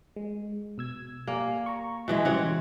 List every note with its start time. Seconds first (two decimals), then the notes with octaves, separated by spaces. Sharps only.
0.16 G#3
0.78 B2 E6 G#6
1.27 A#3 G4 D5 G#5
1.66 A#5 C#6
2.08 B2 E3 G#3
2.25 C#3 E3 G3 C4 F#4 C#5